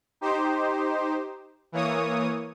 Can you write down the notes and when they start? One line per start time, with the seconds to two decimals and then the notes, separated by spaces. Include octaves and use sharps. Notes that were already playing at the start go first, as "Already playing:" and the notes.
0.21 D#4 G4 C5
1.72 E3 A#3 C#5 D#6